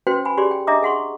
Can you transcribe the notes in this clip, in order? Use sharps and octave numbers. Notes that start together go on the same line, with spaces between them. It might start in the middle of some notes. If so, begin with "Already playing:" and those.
C#4 F#4 B4 C5 G5 C6
G#5 B5
G4 G#4 C#5 D5 C6
G5
D4 D#5 E5 A#5 D6 D#6
G#4 F#5 C6 C#6